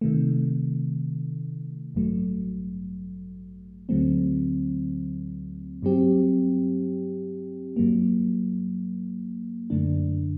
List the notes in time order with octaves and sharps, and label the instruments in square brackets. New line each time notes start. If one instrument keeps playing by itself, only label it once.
[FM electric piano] C3 D#3 A3
A1 G2 F#3 A3
D2 D3 F#3 A3 C4
G2 F#3 C4 G4
G2 F#3 A#3
F#2 D3 A3 D4